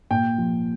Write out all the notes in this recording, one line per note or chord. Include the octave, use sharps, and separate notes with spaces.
A#2 G5
F3